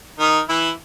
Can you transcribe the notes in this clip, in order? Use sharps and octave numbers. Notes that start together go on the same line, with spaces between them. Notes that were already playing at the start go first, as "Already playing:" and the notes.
D#3 D#4
E3 E4